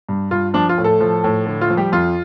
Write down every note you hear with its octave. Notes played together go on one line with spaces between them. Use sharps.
G2
G2 F4
F3 D4
F4
A2
A3 A4
F3
A2
D3
F4
F3
G3 G4
F2 F4